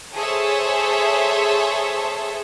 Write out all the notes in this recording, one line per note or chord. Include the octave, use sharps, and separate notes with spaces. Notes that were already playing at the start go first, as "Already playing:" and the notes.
G#4 A4 C5 C#5 E5 A5